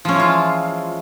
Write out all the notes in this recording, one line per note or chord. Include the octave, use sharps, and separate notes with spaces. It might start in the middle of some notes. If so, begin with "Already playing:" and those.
E3 F3 G#3 C#4 F4